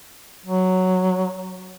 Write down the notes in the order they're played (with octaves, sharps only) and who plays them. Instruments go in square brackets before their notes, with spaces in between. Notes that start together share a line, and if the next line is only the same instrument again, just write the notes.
[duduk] F#3